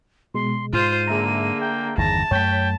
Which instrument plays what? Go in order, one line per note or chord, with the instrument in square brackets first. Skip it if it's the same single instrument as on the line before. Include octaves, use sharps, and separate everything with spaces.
[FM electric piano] B2 G#3 [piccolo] C6
[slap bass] G#2 [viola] F4 C5 [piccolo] D#7
[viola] D3 A#3 [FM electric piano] G#4 E5 A#5
[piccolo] G5
[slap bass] G1 E2 D#3 [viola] A5 [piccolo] A#6
[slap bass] F#2 A3 [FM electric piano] C#5 B6 [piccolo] G5